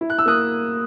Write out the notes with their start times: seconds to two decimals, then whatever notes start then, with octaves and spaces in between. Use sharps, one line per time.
0.01 E4
0.10 F#6
0.19 E6
0.26 A#3 D#6 F#6